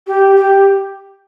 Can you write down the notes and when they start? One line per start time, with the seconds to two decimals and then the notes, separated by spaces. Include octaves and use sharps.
0.07 G4
0.36 G4